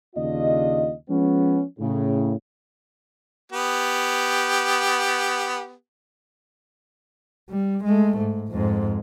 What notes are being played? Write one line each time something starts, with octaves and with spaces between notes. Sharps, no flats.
D#2 C#3 D4 F4 D#5
F3 G#3 B3 C#4
A2 C#3
B3 G4
G3
G#3 A3
G#2
F2 G#2